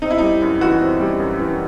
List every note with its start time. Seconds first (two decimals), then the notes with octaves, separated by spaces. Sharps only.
0.02 C4 D#4
0.11 E4
0.18 G3 D#4
0.42 F#2
0.61 E3 F#4
0.81 C4
1.00 G3
1.19 F#2
1.39 E3